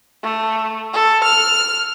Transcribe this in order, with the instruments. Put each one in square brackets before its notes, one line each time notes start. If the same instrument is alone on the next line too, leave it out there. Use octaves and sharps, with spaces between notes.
[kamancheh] A3
A4
F6